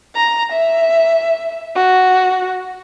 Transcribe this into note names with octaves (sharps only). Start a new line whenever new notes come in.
A#5
E5
F#4